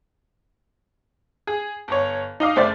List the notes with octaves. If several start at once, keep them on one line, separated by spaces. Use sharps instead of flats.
G#4
G1 C#5
D#4 D#5 F5 D6
F#1 A3 C4 C5 D5 A6